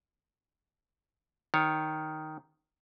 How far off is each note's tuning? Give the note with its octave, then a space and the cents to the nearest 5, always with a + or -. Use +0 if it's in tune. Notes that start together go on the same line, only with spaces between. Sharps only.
D#3 +0 C#5 +0